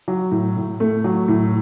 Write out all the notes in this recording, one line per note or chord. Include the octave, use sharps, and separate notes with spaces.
F#3
A2
A2
A3
F#3
A2